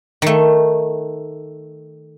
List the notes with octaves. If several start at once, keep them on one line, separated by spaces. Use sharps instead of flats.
D#3 A3